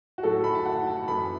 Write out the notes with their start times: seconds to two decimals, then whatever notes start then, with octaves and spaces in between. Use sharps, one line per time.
0.18 F#4
0.23 A2 F#3 A3 A4
0.44 B5
0.55 A5
0.65 F#5
0.87 A5
1.08 F#2 E3 A3 B5